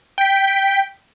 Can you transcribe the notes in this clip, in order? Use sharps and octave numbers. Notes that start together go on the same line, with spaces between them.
G5 B6